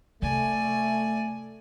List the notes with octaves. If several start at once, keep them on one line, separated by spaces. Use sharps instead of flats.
C3 A3 D5 G#5